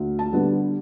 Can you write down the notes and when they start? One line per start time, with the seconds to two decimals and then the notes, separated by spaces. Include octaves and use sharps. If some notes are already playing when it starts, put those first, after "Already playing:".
Already playing: D2
0.19 A5
0.33 D3 G3 B3